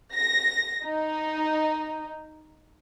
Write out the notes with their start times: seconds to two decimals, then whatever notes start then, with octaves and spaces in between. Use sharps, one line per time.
0.15 A#6
0.85 D#4